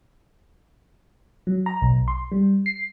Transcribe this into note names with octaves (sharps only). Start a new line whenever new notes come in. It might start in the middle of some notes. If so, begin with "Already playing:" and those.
F#3
A#5
B1
C6
G3
C7